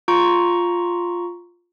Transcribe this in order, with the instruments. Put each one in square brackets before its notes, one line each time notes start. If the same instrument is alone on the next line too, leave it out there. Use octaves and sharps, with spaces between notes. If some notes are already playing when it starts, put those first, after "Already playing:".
[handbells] F4 A#5 C#6